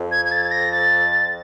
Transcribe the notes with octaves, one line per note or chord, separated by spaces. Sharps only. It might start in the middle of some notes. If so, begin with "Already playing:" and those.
Already playing: F2
G#6
G#6
A6
A#6
A6